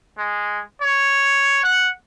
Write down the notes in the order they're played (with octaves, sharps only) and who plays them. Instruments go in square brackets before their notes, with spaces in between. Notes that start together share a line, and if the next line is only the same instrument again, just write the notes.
[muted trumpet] G#3
C#5
F#5